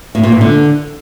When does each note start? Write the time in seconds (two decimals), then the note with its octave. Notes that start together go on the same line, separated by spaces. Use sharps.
0.15 A2
0.23 A#2
0.32 G#2
0.41 D3